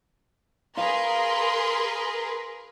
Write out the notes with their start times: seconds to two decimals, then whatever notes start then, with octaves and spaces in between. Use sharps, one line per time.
0.77 G#4 A#4 B4 F5 C6